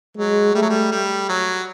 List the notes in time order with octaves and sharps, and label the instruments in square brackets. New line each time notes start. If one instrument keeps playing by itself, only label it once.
[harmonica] F#3 [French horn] G#3
[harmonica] G3 [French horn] A3
[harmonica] F#3
G3
G3
F#3